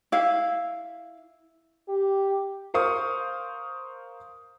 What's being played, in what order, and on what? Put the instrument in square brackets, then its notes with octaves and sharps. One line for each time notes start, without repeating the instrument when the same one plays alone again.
[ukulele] E4 F5
[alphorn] G4
[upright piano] A#4 C5 F5 C#6 D#6